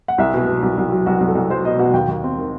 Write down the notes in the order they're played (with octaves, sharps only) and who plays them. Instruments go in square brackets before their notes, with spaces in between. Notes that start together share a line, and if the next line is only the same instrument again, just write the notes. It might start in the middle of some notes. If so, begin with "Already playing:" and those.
[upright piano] F#5
C2 E5
B2
B2
C2
C2
F#3
C2 F#4
C2
A4
C2
F#3 C5
B2 D#5
B2 F#5
D#2 G5
D#2
C4
D#3